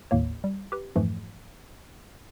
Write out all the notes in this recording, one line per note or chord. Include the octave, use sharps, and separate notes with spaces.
G#1 D#2 A2 A#3 C#5
G3
G4 B4
F2 G#2 E3 F3 A3